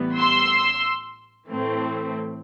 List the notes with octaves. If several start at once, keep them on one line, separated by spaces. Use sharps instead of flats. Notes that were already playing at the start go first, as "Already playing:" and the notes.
Already playing: A1 A2 E3 G3 B3
C6 E6
A2 E3 A3 C4